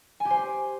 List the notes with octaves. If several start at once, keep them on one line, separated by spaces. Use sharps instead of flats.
G#5
G4
C5